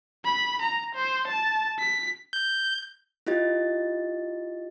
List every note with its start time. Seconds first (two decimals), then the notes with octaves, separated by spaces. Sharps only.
0.25 B5
0.62 A#5
0.95 C5
1.27 A5
1.79 B6
2.33 G6
3.27 E4 F4 G4 D#5 A6